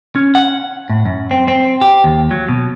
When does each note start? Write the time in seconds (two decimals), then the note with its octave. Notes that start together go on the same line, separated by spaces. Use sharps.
0.16 C#4
0.35 F#5
0.90 A2
1.06 F#2
1.31 C4
1.48 C4
1.81 G4
2.04 D#2
2.31 F#3
2.49 B2